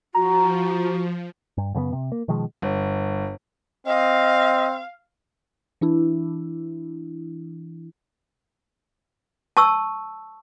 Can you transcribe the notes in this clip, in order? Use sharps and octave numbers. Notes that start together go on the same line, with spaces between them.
F3 F#4 A#5
G2
F#2 C#3 A3 B3
C3
A#3
B2 D#3 F3 G#3
G1
C4 D#5 F5
E3 D4 E4
A5 C#6 E6